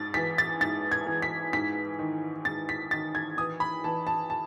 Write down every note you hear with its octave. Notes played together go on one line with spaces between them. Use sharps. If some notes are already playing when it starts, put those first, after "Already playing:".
Already playing: G#2 A6
E3 B6
A6
G#2 A6
G#6
E3
B6
G#2 B6
D#3
G#2 A6
B6
D#3 A6
G#6
E3 D#6
B5
E3 A5
A5
A5